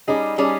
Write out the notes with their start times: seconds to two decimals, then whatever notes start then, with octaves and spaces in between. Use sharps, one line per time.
0.07 G3 C#4 D#4 G#4 D#5
0.38 G3 C#4 G#4